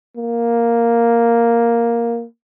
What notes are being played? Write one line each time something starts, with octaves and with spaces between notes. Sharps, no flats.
A#3